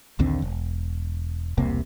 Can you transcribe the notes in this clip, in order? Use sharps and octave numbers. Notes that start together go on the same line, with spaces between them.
A#1 D#2 D3 C4
E1
E1 C2 C3 A#3